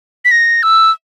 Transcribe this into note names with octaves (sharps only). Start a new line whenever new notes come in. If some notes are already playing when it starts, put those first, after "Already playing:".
B6
A#6
E6